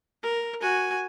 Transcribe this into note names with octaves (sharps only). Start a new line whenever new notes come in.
A#4
F#4 G#5